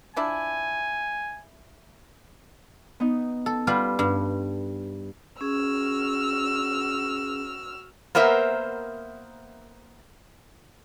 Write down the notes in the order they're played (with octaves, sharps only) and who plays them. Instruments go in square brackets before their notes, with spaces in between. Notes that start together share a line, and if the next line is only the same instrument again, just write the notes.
[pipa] F3 D4 E4 [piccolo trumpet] G#5
[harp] B3 D#4
[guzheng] A4
G3 F4 B4
G2
[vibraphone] C#4 G#4 [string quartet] F#4 E6 F6
[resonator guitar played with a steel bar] A#3 B3 A#4 C5 E5